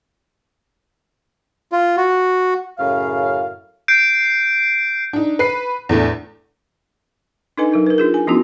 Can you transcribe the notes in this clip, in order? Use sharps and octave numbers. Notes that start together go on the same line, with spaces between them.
F4
F#4
F#2 A2 C#3 F5
G6 C7 D7
D4 D#4
B4 C7
E2 A2 A3 D4
D4 D#4 A4 B4 D#5 G#5
F#3 D#4 A#4
A#4 B4
D4 F4 G#4
G#5
F3 B3 C#4 D4 E4 F#4